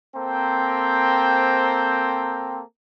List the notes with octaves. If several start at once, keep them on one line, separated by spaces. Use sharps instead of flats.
A#3 C4 A4 C5 G5 A#5